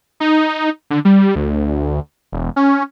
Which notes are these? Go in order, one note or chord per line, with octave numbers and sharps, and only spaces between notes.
D#4
D3
G3
D2
E1
C#4